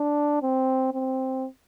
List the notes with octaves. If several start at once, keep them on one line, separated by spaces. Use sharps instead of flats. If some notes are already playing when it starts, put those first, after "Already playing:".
Already playing: D4
C4
C4